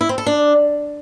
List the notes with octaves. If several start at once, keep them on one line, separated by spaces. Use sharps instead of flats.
E4
C4
A4
D4